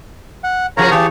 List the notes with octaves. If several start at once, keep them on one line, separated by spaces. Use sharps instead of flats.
F#5
C#3 F3 G#4 A#4 C#5 A#5
E3 G4 G#4 C#5 A5